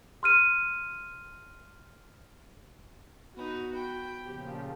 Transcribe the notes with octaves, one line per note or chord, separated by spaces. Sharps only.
C6 F6 D#7
B3 D#4 F#4 B4
G5 B5
A#2 C#3 F3 G4